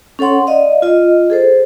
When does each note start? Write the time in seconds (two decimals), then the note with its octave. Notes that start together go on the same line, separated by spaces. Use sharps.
0.19 C#4 A4 C#5 F#5 C6
0.47 D5 D#5 F5
0.82 F4 D#5
1.30 G#4 A4 C5